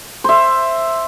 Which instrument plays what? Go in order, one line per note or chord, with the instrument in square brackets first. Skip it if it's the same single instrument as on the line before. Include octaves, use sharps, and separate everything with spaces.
[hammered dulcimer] C5 E5